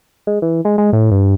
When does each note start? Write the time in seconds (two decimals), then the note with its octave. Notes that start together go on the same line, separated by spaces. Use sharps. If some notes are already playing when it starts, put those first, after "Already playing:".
0.27 G#3
0.42 E3
0.65 G#3
0.78 G#3
0.93 A2
1.11 G2